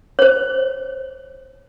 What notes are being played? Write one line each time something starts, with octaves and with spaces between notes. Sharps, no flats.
C5 C#5